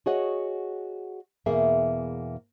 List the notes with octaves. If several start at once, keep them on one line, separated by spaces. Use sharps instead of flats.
F#4 G#4 C#5 D#5 F#5
E2 B2 A#3 G#4 E5